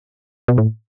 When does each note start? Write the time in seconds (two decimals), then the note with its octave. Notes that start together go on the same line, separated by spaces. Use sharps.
0.48 B2
0.58 A2